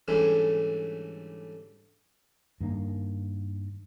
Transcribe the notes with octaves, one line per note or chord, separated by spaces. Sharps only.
G#2 D3 E3 G3 A3 C#4
G2 D#3 A#3